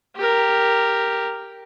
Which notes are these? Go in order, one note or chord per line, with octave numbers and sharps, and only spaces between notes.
G4 A#4